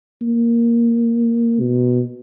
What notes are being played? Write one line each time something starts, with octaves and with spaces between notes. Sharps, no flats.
A#3
B2